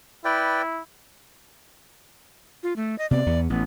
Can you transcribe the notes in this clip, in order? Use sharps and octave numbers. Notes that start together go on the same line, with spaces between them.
E4 B4 D5 G5
F4
A3
D#5
C3 B3 D5
E2 B3
A1 B3